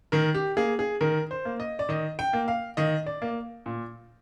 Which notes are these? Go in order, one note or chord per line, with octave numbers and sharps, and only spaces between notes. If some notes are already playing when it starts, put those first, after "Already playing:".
D#3 A#4
G4
A#3 G#4
G#4
D#3 A#4
C5
A#3
D#5
D5
D#3 D#5
G5
A#3
F5
D#3 D#5
D5
A#3
A#2